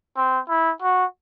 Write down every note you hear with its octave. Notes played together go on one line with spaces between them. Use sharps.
C4
E4
F#4